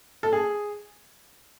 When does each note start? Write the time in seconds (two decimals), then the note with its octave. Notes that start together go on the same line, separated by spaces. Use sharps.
0.23 A4
0.33 G#4